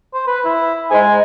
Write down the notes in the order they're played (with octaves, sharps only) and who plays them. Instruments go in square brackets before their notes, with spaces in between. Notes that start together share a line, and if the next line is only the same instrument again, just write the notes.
[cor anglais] C5
B4
E4
[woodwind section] G#2 G#3 [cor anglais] G#5